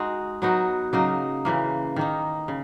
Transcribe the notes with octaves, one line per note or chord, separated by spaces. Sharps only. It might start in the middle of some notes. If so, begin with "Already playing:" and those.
Already playing: G#3 D#4 F#4
F#3 B3 D#4 F#4
C#3 F#3 A#3 D#4
C#3 E3 A#3
D#3 A#3 D#4
C#3